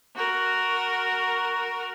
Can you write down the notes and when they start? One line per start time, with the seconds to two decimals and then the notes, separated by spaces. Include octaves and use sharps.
0.16 F#4 A#4